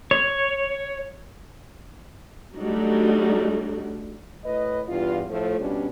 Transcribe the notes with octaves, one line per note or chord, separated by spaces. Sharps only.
C#5
F#3 G3 A3 D4 D#4 F#4
A2 B4 D#5
E2 G2 F4
A2 F3 A3
B2 G3 C#4 D4